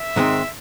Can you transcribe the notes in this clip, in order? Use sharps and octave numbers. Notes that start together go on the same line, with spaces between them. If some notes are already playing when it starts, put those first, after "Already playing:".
Already playing: E5
G#2 D#3 G#3 C4